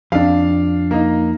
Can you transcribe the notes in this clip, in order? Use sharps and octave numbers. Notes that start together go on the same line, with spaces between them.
F2 D4 F5
A#3 D#4